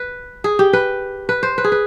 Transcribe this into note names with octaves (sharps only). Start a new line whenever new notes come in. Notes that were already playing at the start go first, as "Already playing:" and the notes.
Already playing: B4
G#4
G4
B4
B4
C5
B4
G#4
B4